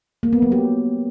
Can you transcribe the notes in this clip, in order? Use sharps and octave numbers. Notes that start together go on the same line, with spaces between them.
A#3
B3
F#3
G4